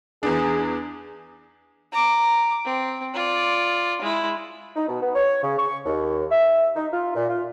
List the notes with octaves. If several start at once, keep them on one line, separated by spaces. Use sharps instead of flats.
E2 B3 D4 G#4
A#5 D6
C4
F4 D5
G#3 E4
D#4
B2
B3
C#5
C#3
C#6
D#2
E5
D#4
F4
A#2
F4